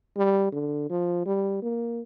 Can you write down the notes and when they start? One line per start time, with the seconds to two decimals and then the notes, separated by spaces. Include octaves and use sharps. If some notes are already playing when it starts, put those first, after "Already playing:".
0.17 G3
0.52 D3
0.90 F3
1.26 G3
1.62 A#3